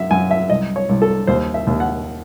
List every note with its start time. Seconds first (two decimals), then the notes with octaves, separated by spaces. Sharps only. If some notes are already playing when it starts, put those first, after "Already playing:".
Already playing: F#2 E5
0.11 F#2 G#5
0.31 E5
0.50 C2 D#5
0.76 C#5
0.89 C2
1.02 A4
1.27 D#2 C5
1.54 E5
1.67 D#2
1.80 F#5